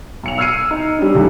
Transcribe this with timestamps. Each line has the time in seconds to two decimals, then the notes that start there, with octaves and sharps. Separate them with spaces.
0.23 B1 C#7 F7
0.38 E6 F6 G#6 C7 C#7 D#7
0.71 D#4
0.99 G3 C#4 D4
1.15 C#2 D#3 E3 G3 A3